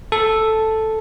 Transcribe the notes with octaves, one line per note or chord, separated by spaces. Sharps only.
A4